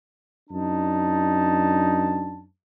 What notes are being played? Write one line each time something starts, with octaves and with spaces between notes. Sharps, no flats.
F#2 D4 D#4 A5